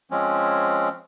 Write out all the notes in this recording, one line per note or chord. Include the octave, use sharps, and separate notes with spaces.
F3 G#3 C4 C#4